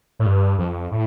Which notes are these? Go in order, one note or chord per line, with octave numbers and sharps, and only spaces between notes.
A2
G2
F2
A2